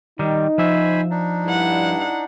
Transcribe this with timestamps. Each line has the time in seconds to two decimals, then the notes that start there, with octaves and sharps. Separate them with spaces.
0.19 D#3 G3 D#4
0.58 F3 C5 E5 G#5 B5
1.11 D4 D#4
1.45 G2 E4 F#5